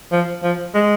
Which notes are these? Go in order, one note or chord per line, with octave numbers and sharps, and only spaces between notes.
F3
F3
G#3